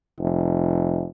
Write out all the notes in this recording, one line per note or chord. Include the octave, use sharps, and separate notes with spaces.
F1